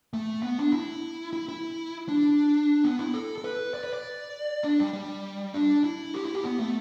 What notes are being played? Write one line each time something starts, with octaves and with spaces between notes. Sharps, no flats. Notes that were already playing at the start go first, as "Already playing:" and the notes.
A3
B3
D4
E4
E4
E4
D4
B3
E4
A4
A4
B4
D5
B4
D5
D4
G3
G3
D4
E4
G4
E4
G4
B3
A3